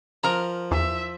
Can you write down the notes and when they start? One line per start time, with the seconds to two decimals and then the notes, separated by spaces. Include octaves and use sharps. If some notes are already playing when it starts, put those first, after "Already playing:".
0.24 F3 A#4 A#5
0.71 E2 E5